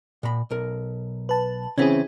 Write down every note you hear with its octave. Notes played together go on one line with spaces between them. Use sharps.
A#2 B5
B1 A#4
B4 A5
C#3 E3 C4 C#4 E4 G#4